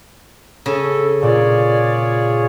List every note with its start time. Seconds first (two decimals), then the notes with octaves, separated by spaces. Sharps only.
0.66 C#3 A4
1.22 A#2 F4 G#4 C#5 D5